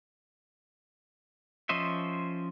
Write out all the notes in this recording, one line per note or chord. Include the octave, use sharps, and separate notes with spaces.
F3 C#4 C5 D#5 E5